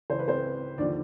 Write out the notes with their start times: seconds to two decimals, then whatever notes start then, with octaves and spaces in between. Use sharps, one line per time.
0.10 C#2 C#3 E3 C5
0.19 B4
0.28 C4 C5
0.78 D#2 D3 F3 D4 D5